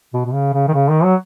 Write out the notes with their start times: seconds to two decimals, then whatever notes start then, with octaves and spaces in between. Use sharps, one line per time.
0.13 B2
0.25 B2
0.33 C#3
0.53 C#3
0.68 D#3
0.73 C#3
0.89 D#3
1.04 F#3